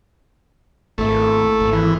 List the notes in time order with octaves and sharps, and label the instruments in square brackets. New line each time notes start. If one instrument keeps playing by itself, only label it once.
[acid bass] G#1 [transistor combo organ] A3 [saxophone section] A#3 E4 A4
[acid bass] G#1
[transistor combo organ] E3